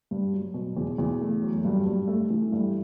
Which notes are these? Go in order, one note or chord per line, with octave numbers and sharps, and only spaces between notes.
G2
F#3
B2
E2
E2
A3
F#3
G2
G2
A3
E3
G2